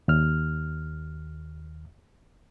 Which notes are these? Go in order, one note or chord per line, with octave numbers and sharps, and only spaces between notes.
D#2 F6